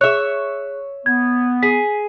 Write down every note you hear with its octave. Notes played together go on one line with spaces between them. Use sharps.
G#4 C#5 E5 F#6
B3 G#6
G#4 B6